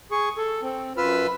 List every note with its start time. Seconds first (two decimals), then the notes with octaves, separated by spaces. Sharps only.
0.11 G#4 C#6
0.37 A4
0.62 C4
0.97 F#2 F4 B4 B5 E6 F6